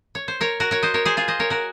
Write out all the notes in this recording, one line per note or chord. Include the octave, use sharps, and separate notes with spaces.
C#5
C5
A#4 C#5
F#4 A#4
A#4 C#5
C5 D#5
A#4 C#5
G#4 C5
F4 G#4
C5 D#5
A#4 C#5
F#4 A#4